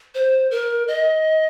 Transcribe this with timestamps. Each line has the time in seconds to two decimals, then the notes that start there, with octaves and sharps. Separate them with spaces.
0.15 C5
0.51 A#4
0.88 D#5